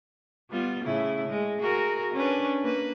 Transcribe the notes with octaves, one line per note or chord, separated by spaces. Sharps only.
G3 B3 F4
A2 C#3 E4
G#3
F#4 G#4 A#4
C#4 D4 B4
A#3 B4